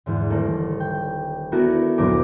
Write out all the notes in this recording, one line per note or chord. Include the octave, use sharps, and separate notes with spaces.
E2 G#2 D3
D#1 A#3 A4
G5
A3 B3 D4 E4 F#4 A#4
F#1 D2 A#2 A#4 D6